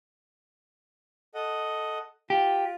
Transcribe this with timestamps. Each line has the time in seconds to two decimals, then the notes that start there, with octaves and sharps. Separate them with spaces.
1.35 A4 D#5 F#5
2.30 F4 G4